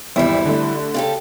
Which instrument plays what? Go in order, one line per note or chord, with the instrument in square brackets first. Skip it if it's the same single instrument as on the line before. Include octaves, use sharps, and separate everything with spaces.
[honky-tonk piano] G#1 E2 E5 [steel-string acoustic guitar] G3 E4
[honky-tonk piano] D3 A3
[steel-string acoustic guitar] C#3 G4 A4